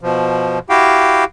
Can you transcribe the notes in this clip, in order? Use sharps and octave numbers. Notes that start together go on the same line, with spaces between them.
B2 F3
E4 F#4 G4 F5 G5